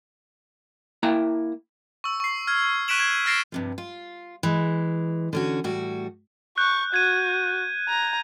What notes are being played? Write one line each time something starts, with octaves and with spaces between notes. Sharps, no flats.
A#3 E4 G5 A#5
C#6 E6
C#6 C7
F6 G#6
C#6 F#6 B6 D7 E7 F#7
G#6
F6 A6 A#6 C7 D7 E7
G2 C3 F3
F4
E3 G#3
D3 C#4 F#4
A2 G3 F#4
C#6 F#6 G6
F#4 G#6 D#7
A#5